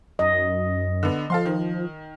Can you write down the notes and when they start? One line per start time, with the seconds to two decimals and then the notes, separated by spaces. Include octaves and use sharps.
0.19 F#2 D#5
1.03 D3 B3
1.30 F3 A4 F5 C6
1.46 D#3